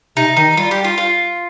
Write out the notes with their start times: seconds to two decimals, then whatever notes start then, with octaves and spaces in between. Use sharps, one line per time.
0.17 C3 D#4
0.36 D#3 D#4
0.57 G3 F4
0.71 G4
0.84 F4
0.98 F4